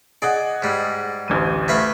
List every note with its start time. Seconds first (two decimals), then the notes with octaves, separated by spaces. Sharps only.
0.22 G#4 D5 D#5 F#5
0.62 G#2 G3
1.28 A1 D2 D#7
1.68 A3 B4 F5